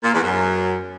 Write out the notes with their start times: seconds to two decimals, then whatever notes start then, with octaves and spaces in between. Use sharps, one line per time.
0.03 A#2
0.13 E2
0.23 F#2